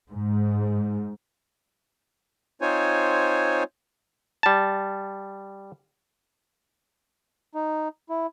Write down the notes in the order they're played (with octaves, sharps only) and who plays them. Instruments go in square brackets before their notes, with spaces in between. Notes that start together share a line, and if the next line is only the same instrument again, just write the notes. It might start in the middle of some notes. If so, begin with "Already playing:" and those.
[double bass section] G#2
[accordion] C4 D#4 F4 C5 C#5 G#5
[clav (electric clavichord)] G3 A5
[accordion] D#4
E4